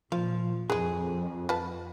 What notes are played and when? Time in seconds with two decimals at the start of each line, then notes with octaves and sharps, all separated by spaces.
0.12 A#2 F3 F5
0.70 F2 E3 G#3 G#4
1.49 F4 B4 A5